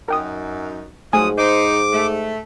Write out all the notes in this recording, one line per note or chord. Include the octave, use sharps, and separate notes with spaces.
F#2 D#4 A#4 G5 D#6
G#2 F3 F#3 A3 G#5 D#6
D#4 C5 D6
A3